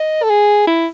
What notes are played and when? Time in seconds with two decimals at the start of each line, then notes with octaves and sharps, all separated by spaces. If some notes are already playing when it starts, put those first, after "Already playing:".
Already playing: D#5
0.23 A4
0.30 G#4
0.67 E4